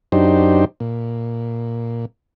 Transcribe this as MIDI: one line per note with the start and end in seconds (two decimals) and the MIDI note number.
0.12 0.65 42
0.12 0.65 62
0.12 0.65 63
0.12 0.65 67
0.12 0.65 72
0.80 2.05 46